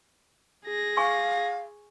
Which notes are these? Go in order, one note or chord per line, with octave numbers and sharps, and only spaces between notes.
G#4 A#6
F5 G#5 C#6 D6